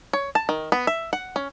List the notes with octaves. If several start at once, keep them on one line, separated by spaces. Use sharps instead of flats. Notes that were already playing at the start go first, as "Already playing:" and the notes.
C#5
A5
D#3
B3
E5
F#5
C#4